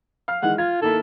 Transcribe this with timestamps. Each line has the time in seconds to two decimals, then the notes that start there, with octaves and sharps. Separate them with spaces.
0.28 F5 F6
0.42 D#3 E3 G#3 F#5
0.58 F4 G#6
0.82 D#3 A#3 E4 A4